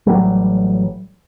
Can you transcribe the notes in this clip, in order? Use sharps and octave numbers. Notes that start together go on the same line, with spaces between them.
A1 F#3 G3